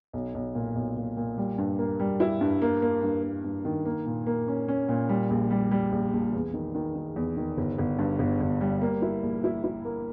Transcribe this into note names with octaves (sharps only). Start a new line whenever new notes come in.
B1
B1
A#2
B1
A#2
A#2
G3
G2
A#3
G3
E4
G2
A#3
A#3
G2
A#3
G2
D#3
A#3
A#2
A#3
C#4
C#4
A#2
G3
A#1
G3
G3
A#1
A#1
E2
D#3
D#3
D#3
E2
D#3
G1
G1
G2
G1
G1
G3
A#3
E4
A#1
E4
E4
A#3